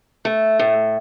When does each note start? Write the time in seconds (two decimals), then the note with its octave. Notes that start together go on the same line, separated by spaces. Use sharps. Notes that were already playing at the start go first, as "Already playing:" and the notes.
0.25 A3
0.59 A2